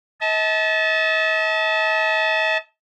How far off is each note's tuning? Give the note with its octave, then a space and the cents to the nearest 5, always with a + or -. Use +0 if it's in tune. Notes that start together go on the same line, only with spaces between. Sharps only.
D#5 +45 A5 -15